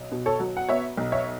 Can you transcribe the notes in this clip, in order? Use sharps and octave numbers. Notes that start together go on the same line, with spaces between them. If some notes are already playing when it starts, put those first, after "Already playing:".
Already playing: B1
B2
A4 C#5
F#3
F#5
B3 C#5 E5
B1
C#5 E5